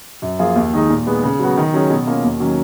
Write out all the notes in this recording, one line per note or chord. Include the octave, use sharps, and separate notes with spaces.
F#2
F3 A#3 F4 G#4
D#2
D#3 G#3 D#4
A#2
G#3 B3
C#3
F#3 B3 F#4
D#3
F#3 C#4 G#4
B2
A#3 C#4 F4
D#2
D#3 F#3 C#4